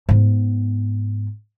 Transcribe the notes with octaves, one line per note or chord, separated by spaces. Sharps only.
G#2 B3